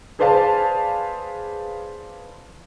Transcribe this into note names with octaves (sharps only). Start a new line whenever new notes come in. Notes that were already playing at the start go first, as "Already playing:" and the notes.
G#4 B4 C5 D5 F5 A5